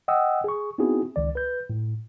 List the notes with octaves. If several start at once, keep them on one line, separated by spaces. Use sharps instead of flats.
D#5 F#5 G5 D#6 E6
G#4 C#6
B3 C4 D#4 E4 F#4 G#4
C#2 D#3 D5
B4 G6
A2